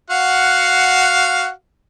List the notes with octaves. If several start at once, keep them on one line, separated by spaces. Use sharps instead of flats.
F#4 F5 F#5